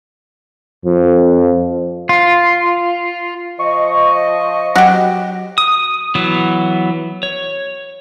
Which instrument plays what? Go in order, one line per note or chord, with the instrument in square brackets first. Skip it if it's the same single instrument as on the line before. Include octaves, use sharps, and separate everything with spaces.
[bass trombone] F2 [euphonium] F3
[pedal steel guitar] F4
[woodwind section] F3 D#5 [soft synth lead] C#6
[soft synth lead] F#3 [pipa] F#4 G4
[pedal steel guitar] D#6
E3 F#3 B3
C#5